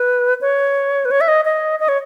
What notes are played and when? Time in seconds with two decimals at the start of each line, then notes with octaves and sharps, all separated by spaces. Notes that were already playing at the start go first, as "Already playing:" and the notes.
Already playing: B4
0.41 C#5
1.05 B4
1.11 C#5
1.21 E5
1.28 D#5
1.45 D#5
1.80 D#5
1.88 C#5